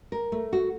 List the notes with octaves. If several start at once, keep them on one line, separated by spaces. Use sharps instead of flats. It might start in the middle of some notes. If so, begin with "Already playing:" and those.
A#4
A3
F#4